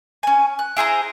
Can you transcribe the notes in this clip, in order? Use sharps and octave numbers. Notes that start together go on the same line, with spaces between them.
C#4 G#5
F#6
E4 G#4 C5 A#5